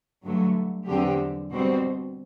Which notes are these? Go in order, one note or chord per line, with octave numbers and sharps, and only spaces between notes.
G2 D3 F#3 A3
E2 D3 F#3 C4 G4
B2 G3 C4 F#4 C5